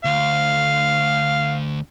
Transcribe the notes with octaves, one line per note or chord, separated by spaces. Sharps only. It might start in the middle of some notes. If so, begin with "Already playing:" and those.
D2 F5